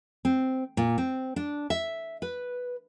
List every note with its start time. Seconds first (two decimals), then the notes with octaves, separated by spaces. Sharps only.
0.25 C4
0.77 A#2
0.98 C4
1.36 D4
1.70 E5
2.22 B4